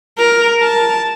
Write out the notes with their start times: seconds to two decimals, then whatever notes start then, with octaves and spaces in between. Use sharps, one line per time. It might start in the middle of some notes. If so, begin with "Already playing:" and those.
0.18 A#4
0.62 A5